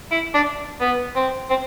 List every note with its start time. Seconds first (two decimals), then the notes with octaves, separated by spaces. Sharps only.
0.12 E4
0.34 D4
0.81 B3
1.16 C4
1.50 C4